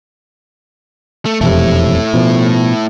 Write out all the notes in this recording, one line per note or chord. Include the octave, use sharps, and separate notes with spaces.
A3
E1 F2 C3 A3 E4
B2 F3